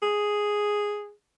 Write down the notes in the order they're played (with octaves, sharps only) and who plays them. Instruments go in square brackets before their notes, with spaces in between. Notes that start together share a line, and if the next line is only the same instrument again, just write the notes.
[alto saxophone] G#4